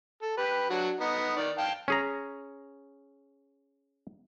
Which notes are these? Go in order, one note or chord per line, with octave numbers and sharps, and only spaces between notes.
A4
G4 B4
F#3 D4 F#4
B3 D#4
D#3 D5
F5 G5 A5
C#4 G#4 A#5